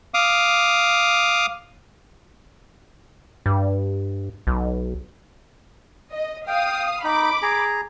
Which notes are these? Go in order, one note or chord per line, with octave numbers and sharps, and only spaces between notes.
F5 D6 D#6
G2
B1
D#5
F5 G5 D#6
D#4 B5 D6
G#4 A#5